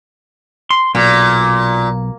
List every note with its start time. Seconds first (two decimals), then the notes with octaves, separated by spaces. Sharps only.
0.71 C6
0.95 B1 A#2